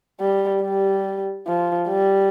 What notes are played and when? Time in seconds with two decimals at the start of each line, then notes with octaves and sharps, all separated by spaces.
0.21 G3
0.63 G3
1.47 F3
1.89 G3